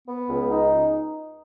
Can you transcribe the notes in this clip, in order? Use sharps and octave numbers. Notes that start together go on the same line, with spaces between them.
B3
C#2
D#4